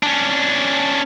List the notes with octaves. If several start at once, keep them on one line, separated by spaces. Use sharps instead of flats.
C#4 D4